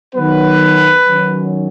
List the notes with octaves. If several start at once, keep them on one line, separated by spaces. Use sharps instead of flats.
D#3 F#3 B3 B4
D#3 F#3 C#4